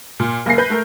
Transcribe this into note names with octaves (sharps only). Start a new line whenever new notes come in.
A#2
F#1 A#3 G#5 A#6 C7
B4 G6
A3 A#4